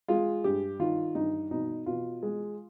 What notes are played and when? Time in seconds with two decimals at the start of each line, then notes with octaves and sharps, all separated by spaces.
0.08 G#3 F4
0.44 G2 G4
0.79 D#3 F4
1.15 G2 D#4
1.51 B2 D#4
1.86 B2 F4
2.23 G#3